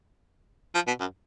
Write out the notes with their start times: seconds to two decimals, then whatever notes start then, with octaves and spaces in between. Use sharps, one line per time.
0.75 F3
0.87 B2
1.00 F#2